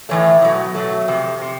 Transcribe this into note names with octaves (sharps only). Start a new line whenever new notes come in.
A2 E3 A3 C#5
B2 F#3 A3
B2 F#3 A3
F2 C3
C3